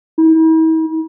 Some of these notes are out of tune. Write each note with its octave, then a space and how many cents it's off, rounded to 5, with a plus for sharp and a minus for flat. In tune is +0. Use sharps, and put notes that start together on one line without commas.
E4 -45